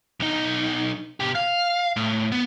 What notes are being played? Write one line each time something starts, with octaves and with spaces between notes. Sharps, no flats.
B1 D#4
B2 G4
F5
A2
B3